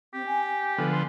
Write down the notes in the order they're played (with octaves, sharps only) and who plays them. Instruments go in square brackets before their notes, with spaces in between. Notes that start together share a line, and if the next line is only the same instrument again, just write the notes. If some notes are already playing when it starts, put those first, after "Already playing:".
[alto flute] C4 [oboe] G4
[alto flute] G#5
[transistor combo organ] D3 F3 B3 [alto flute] A4
[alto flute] G#5 [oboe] C6